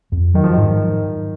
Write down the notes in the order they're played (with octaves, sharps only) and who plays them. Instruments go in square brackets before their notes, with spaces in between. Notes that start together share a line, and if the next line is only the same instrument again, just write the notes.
[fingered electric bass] F2
[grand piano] D#3 [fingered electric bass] F#3
[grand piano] F3
[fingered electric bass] G#2 [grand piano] D#3